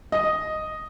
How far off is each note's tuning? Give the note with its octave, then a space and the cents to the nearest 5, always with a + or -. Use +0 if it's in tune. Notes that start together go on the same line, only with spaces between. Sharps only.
D#5 +0